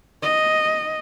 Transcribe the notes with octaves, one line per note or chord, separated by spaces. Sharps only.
D#5